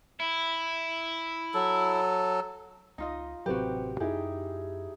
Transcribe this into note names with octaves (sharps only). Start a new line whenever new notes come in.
E4
F#3 A4
C#2 D#4 F4 D#5
A1 C3 F#3 C4 F#4 G4 B4
F#2 D#4 E4 G4 G#4